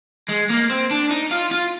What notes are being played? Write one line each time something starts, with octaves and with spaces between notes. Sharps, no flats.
G#3
A#3
C4
D4
D#4
F4
F4